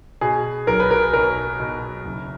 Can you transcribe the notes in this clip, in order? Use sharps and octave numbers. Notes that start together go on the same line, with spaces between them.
B2 G#4
B1 A#4
B4
A#4
B2 A#4
B2
F#1